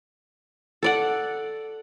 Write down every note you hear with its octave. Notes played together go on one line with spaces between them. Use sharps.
A4 D5 F#5